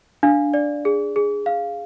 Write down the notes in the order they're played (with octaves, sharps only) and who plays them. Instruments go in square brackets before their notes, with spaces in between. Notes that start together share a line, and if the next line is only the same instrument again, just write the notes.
[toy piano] D4 [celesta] F5
[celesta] D5
G#4
G#4
F5